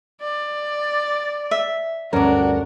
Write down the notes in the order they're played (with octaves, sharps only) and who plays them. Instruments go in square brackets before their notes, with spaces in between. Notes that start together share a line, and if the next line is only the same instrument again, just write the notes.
[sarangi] D5
[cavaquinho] E5
[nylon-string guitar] D2 G2 C#4 [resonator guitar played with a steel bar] D4 A#4 [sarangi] F#4